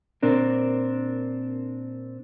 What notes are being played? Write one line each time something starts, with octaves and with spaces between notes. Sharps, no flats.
A#2 C4 D4 A#4